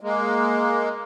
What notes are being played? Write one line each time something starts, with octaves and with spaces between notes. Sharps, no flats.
G#3 A#3